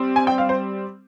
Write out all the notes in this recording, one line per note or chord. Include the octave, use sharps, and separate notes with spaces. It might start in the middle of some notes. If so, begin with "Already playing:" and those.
Already playing: G3 C4
G#5
G5
F5
C5